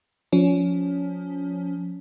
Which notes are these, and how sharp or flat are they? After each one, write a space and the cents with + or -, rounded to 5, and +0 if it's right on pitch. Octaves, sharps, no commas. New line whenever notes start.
F3 +30 C#4 +25